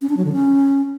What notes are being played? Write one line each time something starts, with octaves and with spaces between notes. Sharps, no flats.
C#4
D4
F#3
D3
C#4